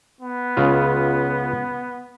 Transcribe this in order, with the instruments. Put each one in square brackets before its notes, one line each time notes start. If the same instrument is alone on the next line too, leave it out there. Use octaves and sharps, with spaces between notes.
[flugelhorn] B3
[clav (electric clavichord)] C#2 C#3 F4